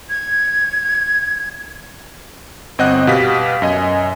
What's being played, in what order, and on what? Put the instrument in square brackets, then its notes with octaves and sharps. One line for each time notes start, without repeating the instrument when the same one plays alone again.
[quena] G#6
[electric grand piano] G1 C4 D#5 F#5 F#6
B2 B3 G4 F5 B6
F#2 D#5 G#5